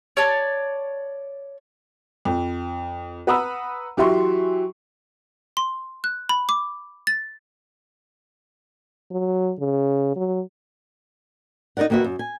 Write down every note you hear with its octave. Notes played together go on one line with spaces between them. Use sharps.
C#5 D5 A5
F2
B4 F#5 A#5 B5 D#6 E6
E3 F#3 G4 E5 C6 C#6
C6
F#6
B5
D6
A6
F#3
C#3
F#3
D#4 F#4 A#4 D5 F#5
D#2 A#3 F#4 B4 E5
F#2
G#5